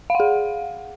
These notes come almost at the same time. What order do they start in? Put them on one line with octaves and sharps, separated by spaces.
F5 F#5 G#4